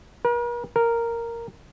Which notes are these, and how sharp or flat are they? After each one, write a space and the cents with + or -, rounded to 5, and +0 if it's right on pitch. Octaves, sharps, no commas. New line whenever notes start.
A#4 +45
A#4 -5